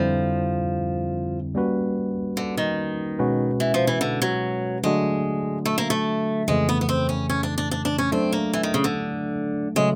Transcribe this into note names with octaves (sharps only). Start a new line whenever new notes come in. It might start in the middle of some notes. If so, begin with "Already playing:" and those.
Already playing: F2 D3 F3 G3 C4 E4
G3 A#3 C#4 F#4 B4
D3
D#3
B2 G#3 C#4 F#4 B4
E3
F3
E3
D3
F#3
D3 F#3 G#3 A3 D4 F#4
A3
A#3
A3
F2 C#3 E3 G#3 A3
B3
B3
C4
C#4
C#4
D4
D4
D4
D4
C#4
F#3 A3 C4 D4
A#3
E3
D#3
C#3
D3
C#3 F#3 G#3 A3